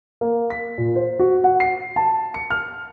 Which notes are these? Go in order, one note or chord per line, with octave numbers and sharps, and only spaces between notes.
A#3
B6
A#2
C5
F#4
F#5
C7
A5
C#7
F6